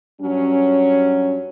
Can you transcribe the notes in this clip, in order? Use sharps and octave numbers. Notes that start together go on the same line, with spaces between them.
G2 F#3 C#4